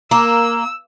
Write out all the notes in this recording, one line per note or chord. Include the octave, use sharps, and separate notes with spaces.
A#3 E6